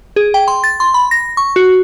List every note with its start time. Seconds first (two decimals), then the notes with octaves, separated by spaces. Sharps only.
0.16 G#4
0.34 G5
0.48 C6
0.64 A6
0.80 C6
0.94 B5
1.11 A#6
1.37 C#6
1.56 F#4